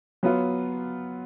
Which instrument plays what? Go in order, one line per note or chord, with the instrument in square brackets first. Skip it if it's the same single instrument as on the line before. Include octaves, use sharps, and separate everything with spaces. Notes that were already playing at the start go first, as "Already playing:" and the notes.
[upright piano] F#3 B3 F4